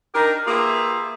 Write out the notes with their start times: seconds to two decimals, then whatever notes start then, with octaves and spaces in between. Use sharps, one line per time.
0.15 D4 D#4 G4 A#4
0.47 A#3 F4 G4 G#4 B4 E5